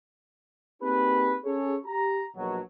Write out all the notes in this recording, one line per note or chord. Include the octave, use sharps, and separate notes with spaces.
A#3 C4 D#4 G4 G#4 B4
C#4 G#4 A4 C#5
G4 A#5
A#1 B2 F#3